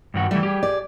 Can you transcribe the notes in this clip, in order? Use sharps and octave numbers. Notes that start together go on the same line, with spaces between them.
G2 D#3 F#4
E3 G3 A3
G4 G#4
D5